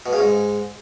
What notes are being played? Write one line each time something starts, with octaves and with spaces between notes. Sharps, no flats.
B2
C#3
G#2